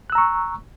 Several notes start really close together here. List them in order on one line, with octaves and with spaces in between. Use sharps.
F#6 E6 A#5 C#6